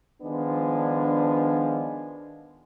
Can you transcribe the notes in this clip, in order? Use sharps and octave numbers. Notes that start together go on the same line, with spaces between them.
D#3 F3 G#3 B3 D4